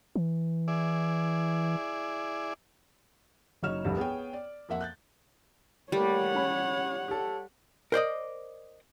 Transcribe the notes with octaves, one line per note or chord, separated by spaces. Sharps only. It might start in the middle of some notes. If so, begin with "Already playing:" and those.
E3
E4 G#4 D5
F#1 F#3 D#4 C#5 F6 E7
F1 C2 G2
B3 G#4 C#5 G5
D5
F2 A#3 E5 F#5
F#6 G6 A6
G3 A3 A#3 C#5 F#5
C#4 B5
G4 A4
A#4 C5 D5 D#5